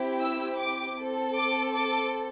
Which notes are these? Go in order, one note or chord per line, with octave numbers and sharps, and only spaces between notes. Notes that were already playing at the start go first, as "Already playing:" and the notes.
Already playing: C4 E4 G4
E6
D6
C4 A4
D6
D6